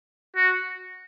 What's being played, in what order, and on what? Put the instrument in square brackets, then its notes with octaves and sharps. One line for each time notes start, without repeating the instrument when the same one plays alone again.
[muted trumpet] F#4